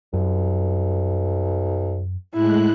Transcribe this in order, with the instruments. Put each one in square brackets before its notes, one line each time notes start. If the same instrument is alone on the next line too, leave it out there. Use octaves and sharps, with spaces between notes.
[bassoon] C2 [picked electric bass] F#2
[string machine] A2 G#3 F#6 [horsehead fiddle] E4